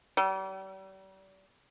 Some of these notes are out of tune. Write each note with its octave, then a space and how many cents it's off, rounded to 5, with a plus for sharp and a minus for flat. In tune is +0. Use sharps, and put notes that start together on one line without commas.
G3 -40